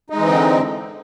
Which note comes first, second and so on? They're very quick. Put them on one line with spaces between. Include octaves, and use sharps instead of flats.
D#4 G#3 E3 C4 D3